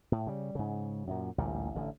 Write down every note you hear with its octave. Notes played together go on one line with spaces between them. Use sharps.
A2
C#3 G3
G#2 C#3
F#2 A#2
A1 D2 A#2 G3
A1 D3